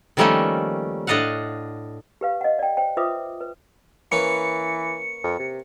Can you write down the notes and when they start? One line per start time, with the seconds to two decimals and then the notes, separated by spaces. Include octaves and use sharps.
0.17 D#3 F3 G3 A3 A#3 C#4
1.07 A2 D4 D#5 F5 F#5
2.21 G4 B4 F5
2.41 D#5 F#5
2.59 D5 G5
2.77 C5 G5
2.97 F4 B4 C5 E5 D6 D#6
3.40 B4
4.12 E3 A#3 C#4 B4 C#7
5.24 F2
5.39 C3